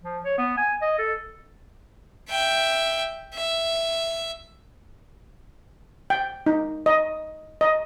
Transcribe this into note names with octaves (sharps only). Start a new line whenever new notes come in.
F3
C#5
B3
G#5
D#5
A4
E5 G5
E5
G5
D#4
D#5
D#5